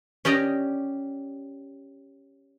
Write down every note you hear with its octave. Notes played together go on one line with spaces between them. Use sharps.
C#4 G4 D5 D#5 A#5